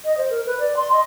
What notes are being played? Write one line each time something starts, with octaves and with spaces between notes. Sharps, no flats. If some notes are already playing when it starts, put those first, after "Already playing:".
D#5
C5
A#4
B4
D5
C6
D#5